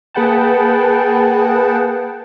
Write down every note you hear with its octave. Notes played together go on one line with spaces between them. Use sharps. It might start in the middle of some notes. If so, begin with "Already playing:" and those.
A#3 G#4 B4 F#5 G5 A5